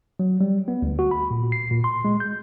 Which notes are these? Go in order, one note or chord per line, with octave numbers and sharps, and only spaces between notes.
F#3
G3
B3
D2
F#4
B5
A#2
C7
A#2
C6
G#3
G6